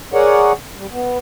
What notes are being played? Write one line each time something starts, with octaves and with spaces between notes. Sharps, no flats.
G#4 A#4 C#5 D5 F#5
G3
B3